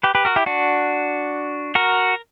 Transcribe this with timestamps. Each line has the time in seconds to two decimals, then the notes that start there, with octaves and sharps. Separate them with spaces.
0.03 G4 B4
0.15 G4 B4
0.25 F#4 A#4
0.36 E4 G4
0.46 D4 F#4
1.75 F#4 A#4